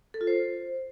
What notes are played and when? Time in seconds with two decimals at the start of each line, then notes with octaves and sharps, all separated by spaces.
0.14 A4
0.21 F4
0.27 C5